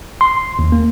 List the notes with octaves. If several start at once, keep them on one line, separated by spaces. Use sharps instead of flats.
C6
D#2
A#3